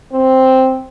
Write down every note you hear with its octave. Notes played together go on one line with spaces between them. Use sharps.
C4